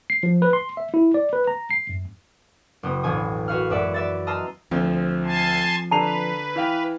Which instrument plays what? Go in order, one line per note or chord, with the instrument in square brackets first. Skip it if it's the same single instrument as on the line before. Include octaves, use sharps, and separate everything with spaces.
[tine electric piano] C7
F3
B4
C6
E5
E4
D5
B4
A#5
C7
F#2
[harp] F#1 B3 G5 D#6
E1 A1 G#5 D#6
F#4 B4 D#5 F5 F#5 F6
F#2 G#3 B4 D5 E5 F#5
D5 E5 A6
D#5 A5 A#5 C6 E6 F6
[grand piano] D2 [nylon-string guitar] F3 C4
[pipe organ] G#5 A5 C6
[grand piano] D3 C7 F7 [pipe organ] B4 [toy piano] A5 A#5
[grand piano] E3 F5 G5